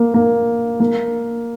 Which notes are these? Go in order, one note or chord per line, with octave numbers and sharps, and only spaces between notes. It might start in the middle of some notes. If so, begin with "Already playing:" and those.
Already playing: A#3
A#3
A#3